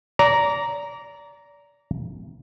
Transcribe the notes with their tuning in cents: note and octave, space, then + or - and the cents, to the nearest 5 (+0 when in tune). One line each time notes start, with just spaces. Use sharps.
D5 -30 A#5 +0